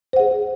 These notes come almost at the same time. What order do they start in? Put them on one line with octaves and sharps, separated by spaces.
C5 F#5 G#4